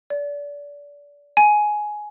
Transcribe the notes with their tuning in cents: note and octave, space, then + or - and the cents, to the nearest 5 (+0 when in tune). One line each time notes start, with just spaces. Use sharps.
D5 -30
G#5 +10